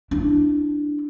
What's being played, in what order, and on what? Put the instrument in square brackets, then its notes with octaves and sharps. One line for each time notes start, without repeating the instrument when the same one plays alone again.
[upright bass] D4 E4